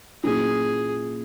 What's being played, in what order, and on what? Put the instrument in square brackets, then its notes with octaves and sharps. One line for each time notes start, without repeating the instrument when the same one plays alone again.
[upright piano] A#2 F#3 C#4 E4 [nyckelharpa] G#4